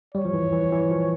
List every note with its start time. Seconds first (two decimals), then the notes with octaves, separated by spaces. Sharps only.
0.14 G3 C#5
0.25 F3
0.33 E3
0.52 E3
0.72 E3
0.91 F3